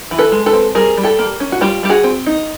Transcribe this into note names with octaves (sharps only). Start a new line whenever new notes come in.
E3
A4 B4
G#3
A4 B4
C4
G3 G#4 A#4
G3
G4 A4
A#3
C#4
F#4
G3 F4 G4
G3 G4
F#4 G#4
C4
D#4